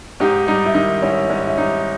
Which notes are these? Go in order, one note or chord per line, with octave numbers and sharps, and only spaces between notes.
G#2 D#4 G4
G3 D#4
E4
D#3 D#4
G#2 C#4 E4
G#2 C#4
E4
G3 D#4